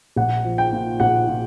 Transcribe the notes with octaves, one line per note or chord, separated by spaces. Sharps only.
A#1 F#5
F3
G5
A#2
A#1 F#5
A#2